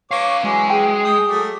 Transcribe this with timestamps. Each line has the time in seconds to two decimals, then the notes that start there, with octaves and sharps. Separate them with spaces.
0.11 B4 C#5 F5 D6
0.44 E3 F#3 G#3 C#4 G#5
0.70 G#4 G5
1.05 G5 D#6
1.28 F#3 A3 D6